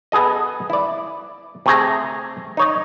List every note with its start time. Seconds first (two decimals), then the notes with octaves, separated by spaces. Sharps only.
0.12 B3 G#4 A4 D#5
0.70 E4 D5
1.66 C3 A3 G#4 A#5
2.57 D#4 C#5 D#5